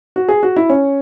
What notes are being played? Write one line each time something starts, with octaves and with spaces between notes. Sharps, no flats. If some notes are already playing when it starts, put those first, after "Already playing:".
F#4
G#4
F#4
E4
C#4